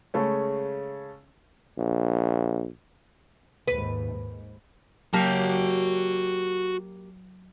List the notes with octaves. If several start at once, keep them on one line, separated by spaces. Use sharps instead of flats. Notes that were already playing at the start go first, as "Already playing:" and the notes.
C#3 G#3 A3 C#4
A#1
D#2 G#2 B4
G#2
F#3 A#3 F#4 G4 A5